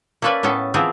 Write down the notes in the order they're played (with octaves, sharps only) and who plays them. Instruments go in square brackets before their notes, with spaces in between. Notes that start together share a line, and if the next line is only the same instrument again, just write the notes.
[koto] A#3 C#4 A4 B4 D5 E5
A2 B3 C#4 A4
E3 F3 B3 C4 G#4 A#4